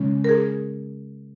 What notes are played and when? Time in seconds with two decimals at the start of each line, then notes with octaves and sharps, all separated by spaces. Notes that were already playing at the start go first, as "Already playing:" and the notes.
Already playing: C#3 G#3 C#4
0.24 A#4
0.29 G#4